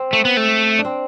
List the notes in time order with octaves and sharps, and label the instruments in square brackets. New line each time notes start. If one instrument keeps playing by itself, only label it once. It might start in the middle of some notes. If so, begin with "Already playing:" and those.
Already playing: [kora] C4
[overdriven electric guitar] A3
B3
A3
[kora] D4
C4